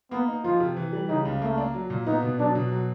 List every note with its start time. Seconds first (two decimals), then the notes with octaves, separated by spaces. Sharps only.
0.11 A#3 B3
0.28 D#4
0.44 F3 F4
0.60 C3
0.77 E3
0.93 G3
1.09 C#3 D#4
1.25 C#2
1.42 A3 A#3
1.58 D4
1.74 F#3
1.90 A#2
2.07 B3 D#4
2.23 B2
2.39 F#3 D4
2.55 B2
2.72 F#3